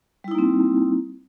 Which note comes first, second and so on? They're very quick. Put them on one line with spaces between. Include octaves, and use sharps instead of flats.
G3 E4 D#4 A#3 C4